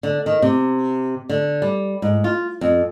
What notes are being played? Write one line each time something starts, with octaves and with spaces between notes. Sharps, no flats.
D3
D#3
C3
D3
G3
G#2
F4
F2